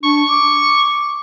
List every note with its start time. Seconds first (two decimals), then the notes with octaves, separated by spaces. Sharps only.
0.03 D4 C#6
0.29 D6